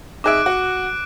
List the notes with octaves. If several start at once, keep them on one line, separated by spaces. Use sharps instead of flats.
D#4 G#4 E5 D6 F#6 D7
F#4